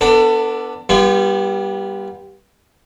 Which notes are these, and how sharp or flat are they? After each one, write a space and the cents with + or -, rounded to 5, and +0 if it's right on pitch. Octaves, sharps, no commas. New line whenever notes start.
B3 +0 D4 +0 A4 +30
G3 +0 B3 -35 F4 -35